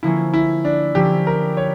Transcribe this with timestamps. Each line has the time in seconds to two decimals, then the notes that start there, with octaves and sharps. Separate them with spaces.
0.03 D3 F3 A#3 C#4 E4
0.34 E4
0.65 D4
0.95 D3 F3 A#3 C#4 G4
1.27 A#4
1.57 C#5